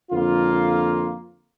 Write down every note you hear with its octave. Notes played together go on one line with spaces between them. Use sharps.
F2 D3 A#3 F4